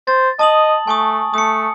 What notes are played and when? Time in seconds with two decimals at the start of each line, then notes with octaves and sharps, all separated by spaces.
0.07 C5 A6
0.39 D#5 A5 D#6 F#7
0.87 A3 G#5 C#6 D#6
1.34 A3 D#6 C#7